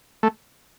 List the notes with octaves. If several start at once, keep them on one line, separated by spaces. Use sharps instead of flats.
A3